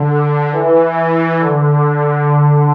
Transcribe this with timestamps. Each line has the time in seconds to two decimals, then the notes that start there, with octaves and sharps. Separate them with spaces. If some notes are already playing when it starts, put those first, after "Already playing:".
Already playing: D3
0.52 E3
1.39 D3